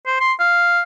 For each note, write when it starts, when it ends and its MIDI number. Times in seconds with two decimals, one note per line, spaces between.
0.07 0.18 72
0.20 0.33 84
0.40 0.81 77